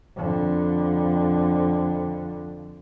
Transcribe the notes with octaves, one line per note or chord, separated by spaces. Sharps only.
F2 D3